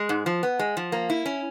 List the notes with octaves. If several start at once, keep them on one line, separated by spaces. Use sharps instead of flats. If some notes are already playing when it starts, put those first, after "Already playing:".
Already playing: G#3
G#2
F3
B3
G#3
F3
A#3
E4
C#4